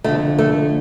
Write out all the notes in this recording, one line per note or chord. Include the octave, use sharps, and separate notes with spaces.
F2 D3 A3
A3